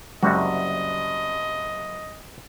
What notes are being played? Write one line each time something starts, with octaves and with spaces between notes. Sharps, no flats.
F#1 C3 G3 F#4 D#5